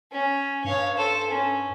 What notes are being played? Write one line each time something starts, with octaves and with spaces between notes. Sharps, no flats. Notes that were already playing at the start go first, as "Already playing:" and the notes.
C#4
G2 C#5 F5
A4 C5
C#4